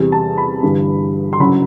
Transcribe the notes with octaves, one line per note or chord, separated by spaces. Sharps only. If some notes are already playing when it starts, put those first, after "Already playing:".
Already playing: E2 C3 G3
A5
B5
G1 G2 E3
C6
F#1 F#2 F#3 B5